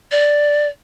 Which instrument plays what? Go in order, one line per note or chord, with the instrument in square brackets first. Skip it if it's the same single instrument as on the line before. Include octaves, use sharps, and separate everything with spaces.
[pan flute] D5